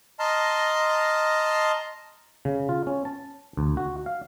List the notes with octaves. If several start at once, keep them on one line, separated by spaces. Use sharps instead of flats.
D#5 A5 A#5 C6 F6
C#3
F4
C#4
A5
D2
F#4
F5